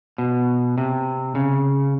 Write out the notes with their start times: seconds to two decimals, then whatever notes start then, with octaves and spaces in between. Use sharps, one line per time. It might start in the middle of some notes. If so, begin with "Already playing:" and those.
0.18 B2
0.78 C3
1.35 C#3